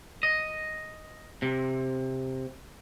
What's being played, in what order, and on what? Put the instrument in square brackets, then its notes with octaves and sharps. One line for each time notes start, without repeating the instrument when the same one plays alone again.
[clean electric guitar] D#5
C3